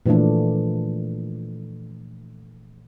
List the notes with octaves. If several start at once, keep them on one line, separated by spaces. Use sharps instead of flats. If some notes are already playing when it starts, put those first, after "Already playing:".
A#2 E3 F3 A3 D4